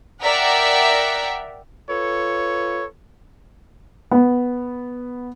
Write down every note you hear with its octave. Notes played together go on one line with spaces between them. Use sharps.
A#4 D5 E5 F#5 G5
F4 A4 B4 C#5
B3